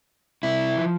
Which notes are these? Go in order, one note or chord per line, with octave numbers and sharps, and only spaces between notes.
C3 E4
F3